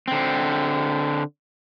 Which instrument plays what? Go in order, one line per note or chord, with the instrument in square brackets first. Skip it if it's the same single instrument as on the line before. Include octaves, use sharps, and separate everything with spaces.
[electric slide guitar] D3 C4